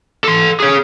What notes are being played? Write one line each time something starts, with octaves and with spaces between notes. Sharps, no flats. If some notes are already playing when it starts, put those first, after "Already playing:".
A4 C6
G#4 C#5